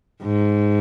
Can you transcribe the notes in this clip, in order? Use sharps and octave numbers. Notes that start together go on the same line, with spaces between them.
G#2